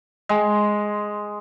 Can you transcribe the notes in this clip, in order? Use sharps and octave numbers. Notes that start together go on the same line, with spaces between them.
G#3